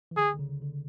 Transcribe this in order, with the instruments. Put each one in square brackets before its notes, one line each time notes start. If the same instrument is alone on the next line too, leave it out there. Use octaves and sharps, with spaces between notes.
[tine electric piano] E3
[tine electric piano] D3 [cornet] G#4
[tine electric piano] D3
C#3
D3